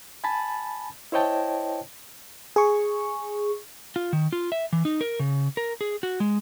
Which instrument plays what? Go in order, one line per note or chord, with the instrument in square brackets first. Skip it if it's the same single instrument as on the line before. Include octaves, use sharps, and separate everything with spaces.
[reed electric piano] G#5 A5 B5 A6
E4 C5 C#5 D#5 G5 A5
[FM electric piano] G#4 C#6
[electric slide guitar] F4
D#3
F4
E5
E3
D#4
A#4
C#3
A#4
G#4
F#4
G#3